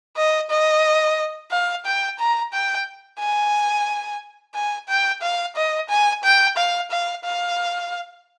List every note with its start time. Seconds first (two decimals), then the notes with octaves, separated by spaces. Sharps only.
0.17 D#5
0.50 D#5
1.51 F5
1.85 G5
2.19 A#5
2.53 G5
3.19 G#5
4.55 G#5
4.88 G5
5.22 F5
5.56 D#5
5.89 G#5
6.24 G5
6.57 F5
6.91 F5
7.24 F5